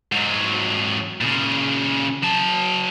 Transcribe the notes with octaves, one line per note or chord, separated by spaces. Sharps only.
G#2 F#3
A#2 C#3
F#3 A5